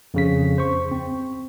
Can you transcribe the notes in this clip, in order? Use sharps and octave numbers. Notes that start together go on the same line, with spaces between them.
F2 C#3 B6
C5 C#6
C4